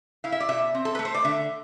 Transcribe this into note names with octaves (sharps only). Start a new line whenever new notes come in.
E4 F5
E5
D5
B2 E5
C4
A4
A3 B4
C5
D5
D3 E5